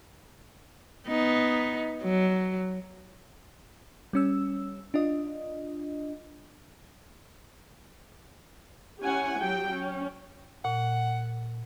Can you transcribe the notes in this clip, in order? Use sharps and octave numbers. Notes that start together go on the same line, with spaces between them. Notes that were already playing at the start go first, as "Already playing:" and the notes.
B3 D#4
F#3
G3 C#4 E6
D4 F4 D#5
C#4 E4 G4 F#5 G#5
F#3 G4 G5
C#4
A#2 F#5